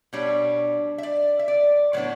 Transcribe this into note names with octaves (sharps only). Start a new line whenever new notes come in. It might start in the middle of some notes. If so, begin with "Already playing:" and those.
B2 G3 D4 C#5
E5
D5
E5
D5
A2 F#3 B3 D4 C#5